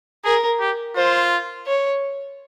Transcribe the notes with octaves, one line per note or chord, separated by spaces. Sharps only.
G#4 A#4
G4
F4 C5
C#5